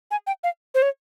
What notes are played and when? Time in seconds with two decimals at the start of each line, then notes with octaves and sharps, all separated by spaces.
0.11 G#5
0.27 G5
0.44 F5
0.74 C5
0.82 C#5